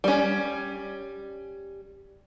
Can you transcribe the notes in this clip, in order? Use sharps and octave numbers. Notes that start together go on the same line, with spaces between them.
G3 C#4